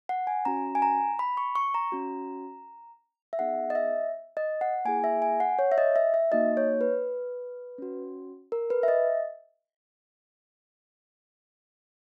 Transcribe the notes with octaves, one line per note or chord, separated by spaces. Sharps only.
F#5
G#5
C#4 F#4 A#5
G#5
A#5
B5
C#6
C#6
A#5
C#4 F#4
E5
B3 D#4 G#4 F#5
D#5
E5
D#5
F#5
A#3 E4 G#4 G#5
E5
G#5
F#5
C#5
E5
D#5
E5
E5
A#3 D#4 F#4 D#5
C#5
B4
C#4 F#4
A#4
B4
E5
D#5